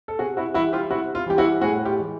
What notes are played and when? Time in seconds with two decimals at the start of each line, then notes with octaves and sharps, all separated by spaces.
0.08 A4
0.19 C3 F#4 G#4
0.37 E4 F#4
0.54 G3 E4 F#4
0.58 E3
0.73 F4 G4
0.91 C3 E4 F#4
1.15 F4
1.26 E3 G3 G4
1.38 E4 F#4
1.61 A2 F#4 G#4
1.85 F4 G4
1.98 E3 G#3